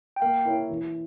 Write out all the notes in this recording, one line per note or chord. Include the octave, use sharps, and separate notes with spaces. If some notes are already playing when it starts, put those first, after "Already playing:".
G5
A#3 F5
E4 A#4 C#5
E3